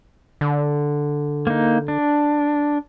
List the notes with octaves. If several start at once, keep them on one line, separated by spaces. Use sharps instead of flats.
D3
A#3 D#4
D4